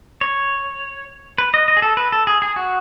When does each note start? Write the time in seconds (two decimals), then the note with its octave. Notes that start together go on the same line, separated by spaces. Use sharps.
0.21 C#5
1.38 B4
1.54 D#5
1.68 D#5
1.77 G#4
1.82 A4
1.97 B4
2.12 A4
2.27 G#4
2.42 G#4
2.56 F#4